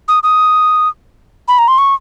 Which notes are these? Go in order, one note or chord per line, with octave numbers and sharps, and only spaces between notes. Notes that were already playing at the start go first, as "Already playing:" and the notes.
D#6
D#6
B5
A#5
C6
C#6